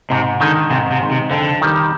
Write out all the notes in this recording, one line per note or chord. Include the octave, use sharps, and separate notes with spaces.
G#2 C3
D3 D#3 G#3 D#4
G#2 C3
C3
D#3 G#3 D#4
C3
F2 D3
D#3 G3